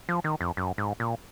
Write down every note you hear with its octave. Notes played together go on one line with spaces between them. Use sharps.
F3
D#3
F2
F#2
G#2
A#2